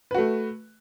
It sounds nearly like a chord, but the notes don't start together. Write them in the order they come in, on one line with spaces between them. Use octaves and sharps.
B4 F#4 A3